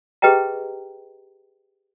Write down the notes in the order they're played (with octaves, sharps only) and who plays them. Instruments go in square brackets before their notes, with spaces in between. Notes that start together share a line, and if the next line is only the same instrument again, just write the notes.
[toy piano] G4 G#4 B4 D#5 G5 A#5